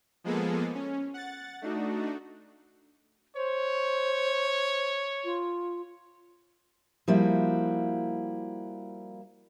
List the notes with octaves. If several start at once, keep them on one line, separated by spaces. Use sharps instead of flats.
F3 G#3 A#3 B3 G#4 A4
C#4
F#5 A6
A3 D4 D#4 F#4
C5 C#5
F4
F3 G3 A#3 E4 F#4